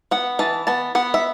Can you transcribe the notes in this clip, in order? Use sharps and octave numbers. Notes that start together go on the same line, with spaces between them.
B3 F#5
E3 A5
B3 A5
B3 F#5
E5